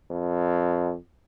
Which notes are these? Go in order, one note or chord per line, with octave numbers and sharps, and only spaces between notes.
F2